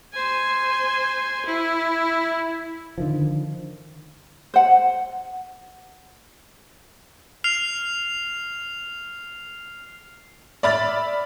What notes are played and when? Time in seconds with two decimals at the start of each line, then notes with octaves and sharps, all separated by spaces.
0.13 C5 G#5
1.46 E4
2.98 D3 D#3 F3
4.54 C5 F#5
7.44 F6 C7 F7
10.63 D5 E5 B5 F6 A6